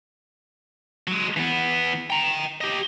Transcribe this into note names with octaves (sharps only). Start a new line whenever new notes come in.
F#3 G#3
E3 B3
G5 A#5
G4 D#5